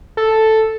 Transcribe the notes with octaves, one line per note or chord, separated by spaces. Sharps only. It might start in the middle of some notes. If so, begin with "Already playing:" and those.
A4